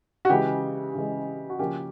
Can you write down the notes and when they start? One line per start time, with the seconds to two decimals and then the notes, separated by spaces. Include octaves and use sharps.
0.25 F#4
0.29 C#3 E3 G#3 G4
0.95 C#3 E3 G#3
1.50 F#4
1.59 C#3 F3 A#3 C#4 G4